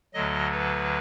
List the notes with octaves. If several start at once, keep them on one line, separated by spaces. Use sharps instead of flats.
D2 D3 F#3 D#5
B4